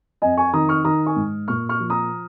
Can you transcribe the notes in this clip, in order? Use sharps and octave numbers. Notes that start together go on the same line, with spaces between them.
F2 D#5 G#5
G#5 C#6
D#3 A#5 D#6
C#6 F6
D#3 A#5 D#6
G#5 C#6
G#2
A#2 C#6 F6
C#6 F6
F3
A#5 D#6